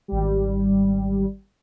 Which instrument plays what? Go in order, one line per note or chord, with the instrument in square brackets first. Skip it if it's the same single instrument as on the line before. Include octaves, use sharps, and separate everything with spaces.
[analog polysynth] G#1 G3